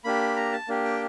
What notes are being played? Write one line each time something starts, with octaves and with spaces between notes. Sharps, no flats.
A#3 D4 G4 B5
A#5
A5
A#3 D4 G4
G5